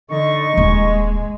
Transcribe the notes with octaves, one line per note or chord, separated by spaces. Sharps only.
D3 D#4 D#5 C#6
D#1 G#3